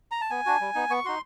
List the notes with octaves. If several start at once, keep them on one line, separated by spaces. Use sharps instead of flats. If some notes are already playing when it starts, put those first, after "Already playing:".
A#5
A5
B3 G#5
D4 F#4
G3
B3 D#4
B3 C#6
D#4 F#4 C6